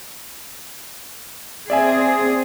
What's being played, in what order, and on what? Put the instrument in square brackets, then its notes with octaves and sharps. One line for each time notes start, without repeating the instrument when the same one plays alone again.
[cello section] C4 G#4 [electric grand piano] D5 E5 G#5